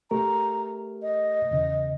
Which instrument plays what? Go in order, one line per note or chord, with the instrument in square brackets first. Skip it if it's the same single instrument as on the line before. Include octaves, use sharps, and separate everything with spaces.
[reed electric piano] A3 G4 A#4 [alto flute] A#5
[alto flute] D#5
[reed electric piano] E2 C#3